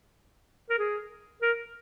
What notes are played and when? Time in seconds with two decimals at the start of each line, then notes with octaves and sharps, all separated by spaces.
0.70 A#4
0.78 G#4
1.42 A#4